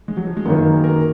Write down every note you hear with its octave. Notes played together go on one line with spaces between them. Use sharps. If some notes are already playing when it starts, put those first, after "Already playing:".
G#3
F#3
F3
G#3
F#2 D#3 A#3 B3
G#4
A#4